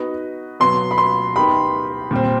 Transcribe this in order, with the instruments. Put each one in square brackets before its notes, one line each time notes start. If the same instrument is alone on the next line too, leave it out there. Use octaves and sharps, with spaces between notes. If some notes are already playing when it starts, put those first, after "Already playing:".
Already playing: [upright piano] B3 D#4 F#4 B4 D#5
[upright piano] B2 F#3 B3 [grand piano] C6
[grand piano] B5
C6
[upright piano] B3 D#4 G4 A#4 [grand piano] B5
[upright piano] A#2 G3 C4